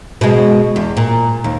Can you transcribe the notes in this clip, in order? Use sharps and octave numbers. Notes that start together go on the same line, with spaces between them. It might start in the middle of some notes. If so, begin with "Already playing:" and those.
B2 G#3
E2
A#2
D#2